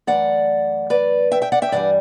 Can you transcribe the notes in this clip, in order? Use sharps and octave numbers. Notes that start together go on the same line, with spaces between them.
F#2 E3 A3 D5 F#5
B4 D5
E5 G5
E5 G5
D5 F#5
E5 G5
G2 E3 G3 D5 F#5